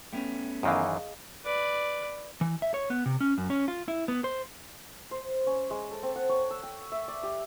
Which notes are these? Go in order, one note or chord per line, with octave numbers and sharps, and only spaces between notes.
A3 B3 C#4 G5
F#2 D#3 E3 G#4 D#5 F5
B4 D5
E3
E5
C#5
B3
C3
C#4
F#2
C#4
F4
E4
B3
C5
C5
C#4
G#3
A4
C4
F#5
C#5
E6
G5
E5
D5
G4